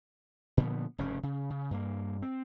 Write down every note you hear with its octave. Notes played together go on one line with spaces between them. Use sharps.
A#2 D3 F3 B3
F1 G2 C#3 C#4
C#3
C#3
G2 A#3
C4